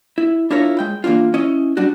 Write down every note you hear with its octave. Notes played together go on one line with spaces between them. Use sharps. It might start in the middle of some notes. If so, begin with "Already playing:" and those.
E4
D4 E4 F4 A#4 C#5
G#3 G5
E3 A#3 C4 D4 F4
C#4 E4 D#5
F#3 G3 D4 F#4